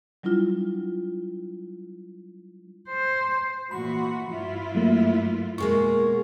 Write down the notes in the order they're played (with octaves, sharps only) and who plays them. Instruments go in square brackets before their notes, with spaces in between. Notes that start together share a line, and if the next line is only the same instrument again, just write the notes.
[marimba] F#3 G3 D4 E4 F4
[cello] C5
[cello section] A#2 E3 F#4 [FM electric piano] B5 C6
[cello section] G2 E4 F4
[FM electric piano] F#3 A3 A#3
[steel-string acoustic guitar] B2 G#3 A#3 [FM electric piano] C#6